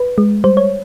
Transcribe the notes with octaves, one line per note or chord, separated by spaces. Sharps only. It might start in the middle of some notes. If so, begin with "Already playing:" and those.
Already playing: B4
G#3
G3 C5
C#5